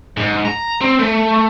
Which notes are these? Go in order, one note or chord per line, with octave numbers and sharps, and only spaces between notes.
G#2
A#5
C4
A3